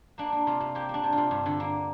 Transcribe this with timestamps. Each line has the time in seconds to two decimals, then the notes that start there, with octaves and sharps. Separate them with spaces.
0.18 A#3 D4
0.32 A#3
0.47 C3 F4
0.60 C3
0.75 A#3 G4
0.89 A#3
0.94 D4
1.04 C3
1.12 F4
1.18 C3
1.31 G2
1.46 D3
1.60 A#3